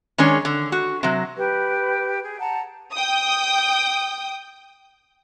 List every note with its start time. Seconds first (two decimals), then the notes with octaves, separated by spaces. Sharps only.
0.18 D#3 G#3 C#4 D4 C#5
0.45 D3
0.72 F#4
1.03 C3 F#3
1.37 G4 B4
2.22 G#4
2.39 F#5 A5 A#5
2.93 G5 D#6